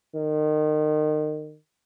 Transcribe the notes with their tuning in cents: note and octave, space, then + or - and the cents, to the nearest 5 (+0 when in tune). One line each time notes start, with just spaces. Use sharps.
D#3 -30